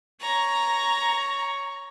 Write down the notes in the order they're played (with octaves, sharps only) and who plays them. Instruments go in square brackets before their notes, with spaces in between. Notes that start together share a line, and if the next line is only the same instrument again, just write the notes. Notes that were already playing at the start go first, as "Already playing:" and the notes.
[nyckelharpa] C#5 C#6 [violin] A#5